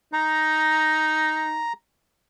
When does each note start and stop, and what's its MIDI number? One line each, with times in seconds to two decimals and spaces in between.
0.13 1.66 63
0.13 1.73 82